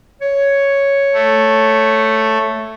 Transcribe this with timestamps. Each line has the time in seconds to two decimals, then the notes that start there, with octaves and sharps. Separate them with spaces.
0.22 C#5
1.13 A3